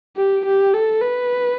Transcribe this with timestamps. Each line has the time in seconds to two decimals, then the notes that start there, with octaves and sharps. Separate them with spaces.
0.17 G4
0.45 G4
0.74 A4
1.01 B4